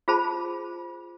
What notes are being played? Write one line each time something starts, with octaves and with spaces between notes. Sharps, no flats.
F4 G#4 C5 A5 B5